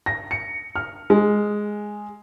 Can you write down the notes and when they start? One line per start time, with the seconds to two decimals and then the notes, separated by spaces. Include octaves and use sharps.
0.06 A#6
0.31 C#7
0.76 F6
1.10 G#3